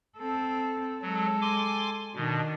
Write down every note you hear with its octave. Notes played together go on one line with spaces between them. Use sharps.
C4 A4
F#3 G#3 A4
G#5 C6 D6
B2 D#3 D4